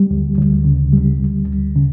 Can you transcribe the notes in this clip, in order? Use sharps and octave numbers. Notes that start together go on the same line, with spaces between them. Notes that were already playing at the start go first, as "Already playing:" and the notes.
Already playing: G3
D2
D2
C#3
G3
D2
D2
C#3